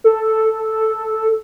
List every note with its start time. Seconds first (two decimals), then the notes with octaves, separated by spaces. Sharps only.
0.04 A4